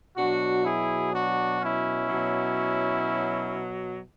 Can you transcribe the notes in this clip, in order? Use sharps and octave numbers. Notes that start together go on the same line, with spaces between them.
B2 F#3 D4 F#4
E4 G#4
D4 F#4
C#4 E4
F#3
B2